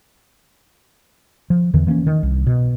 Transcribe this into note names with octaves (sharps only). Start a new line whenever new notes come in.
F3
E2 D3 E3
E3 A#3 C4 C#4
D#3
C2
B2